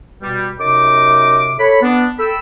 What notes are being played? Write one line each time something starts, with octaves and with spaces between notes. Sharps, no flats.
B2 G3
F#2 C3 D#4 D#5 D6
A4 C#5 B5
B3 D4
A4 G5 B5 E6